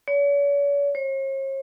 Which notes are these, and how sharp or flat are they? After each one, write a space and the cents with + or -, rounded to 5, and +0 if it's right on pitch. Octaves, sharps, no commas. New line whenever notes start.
C#5 +45
C#5 -45